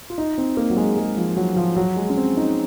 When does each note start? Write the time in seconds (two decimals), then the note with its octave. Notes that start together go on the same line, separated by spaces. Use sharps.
0.10 F4
0.18 D#4
0.38 C4
0.57 A#3
0.70 F#3
0.77 G#3
0.97 G#3
1.17 F3
1.36 F#3
1.56 F3
1.76 F#3
1.97 G#3
2.10 C#4
2.17 C4
2.37 D#4